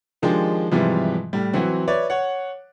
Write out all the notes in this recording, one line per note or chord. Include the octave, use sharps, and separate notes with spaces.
D#3 F3 G#3 D4 G4 G#4
G#2 C3 E3 F3 G3
A2 G3
E3 F#3 C4 F#4
B4 C#5 D5 E5
C#5 F#5